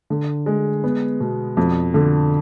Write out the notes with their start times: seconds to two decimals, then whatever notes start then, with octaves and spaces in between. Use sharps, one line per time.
0.10 D3
0.46 G#3
0.84 B3
1.20 B2
1.57 F2
1.94 D3